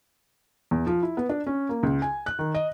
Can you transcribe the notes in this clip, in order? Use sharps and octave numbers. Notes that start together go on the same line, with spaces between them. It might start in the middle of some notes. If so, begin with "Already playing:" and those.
E2
F3
E4
B3
D4
C#4
A#3
C#2
G#5
F#6
D#3
D#5